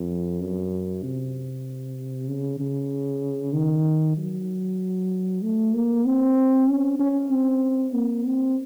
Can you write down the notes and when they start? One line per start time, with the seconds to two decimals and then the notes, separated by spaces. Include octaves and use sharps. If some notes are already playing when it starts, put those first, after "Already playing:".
Already playing: F2
0.41 F#2
1.03 C3
2.28 C#3
2.60 C#3
3.54 D#3
4.17 F#3
5.43 A3
5.74 A#3
6.05 C4
6.69 C#4
6.99 C#4
7.31 C4
7.93 A#3
8.25 C4